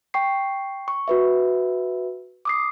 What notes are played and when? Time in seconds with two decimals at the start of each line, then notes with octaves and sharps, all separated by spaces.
0.14 G5 C#6 C7
0.88 C#6
1.08 F#4 B4 E5
2.45 D6 D#6 C7